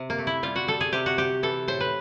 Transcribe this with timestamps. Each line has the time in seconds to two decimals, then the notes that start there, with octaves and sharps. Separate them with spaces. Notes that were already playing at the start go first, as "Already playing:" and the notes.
Already playing: C3
0.10 A#3
0.18 A3
0.27 E4
0.43 G3 F4
0.56 F#4
0.68 G3 A4
0.81 G#4
0.93 C3 G4
1.06 F#4
1.18 C3 G4
1.43 E3 A4
1.68 A2 C5
1.80 B4